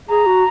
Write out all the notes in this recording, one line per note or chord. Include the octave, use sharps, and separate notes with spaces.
G#4 A#5
F#4